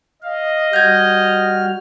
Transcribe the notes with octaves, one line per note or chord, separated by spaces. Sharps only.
D#5 F5
G3 F#4 F6 G6 G#6